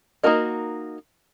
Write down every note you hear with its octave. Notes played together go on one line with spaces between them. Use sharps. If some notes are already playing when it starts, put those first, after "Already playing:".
A#3 D#4 F#4 A#4 D#5